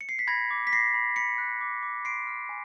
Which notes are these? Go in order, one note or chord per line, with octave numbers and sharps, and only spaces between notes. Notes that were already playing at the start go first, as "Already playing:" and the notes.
C#7
C7
B6
B5 G#6 A#6
D6
B6
B5 A#6 C7
B5
B5 B6 C#7
F#6
D6
D6
C6 C7 D7
F6
G#5